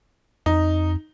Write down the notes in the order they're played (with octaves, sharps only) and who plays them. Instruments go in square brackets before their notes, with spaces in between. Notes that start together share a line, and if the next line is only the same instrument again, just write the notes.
[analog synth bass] F2 [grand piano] D#4